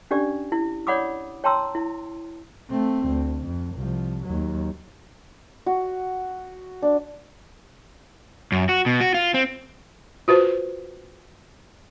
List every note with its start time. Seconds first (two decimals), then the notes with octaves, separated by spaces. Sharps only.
0.11 C#4 D4 G4 D5
0.52 E4
0.87 C#5 D5 F#5 B5 D6 D#6
1.44 C#5 G5 A5 A#5 C6 E6
1.75 E4
2.70 A3 C4
3.07 D2
3.46 F2
3.75 C2 F3
4.24 D#2 F#3
5.66 F#4
6.82 D4
8.52 F#2
8.69 F#4
8.86 B2
9.01 F#4
9.14 F4
9.34 C4
10.28 F4 F#4 B4 C5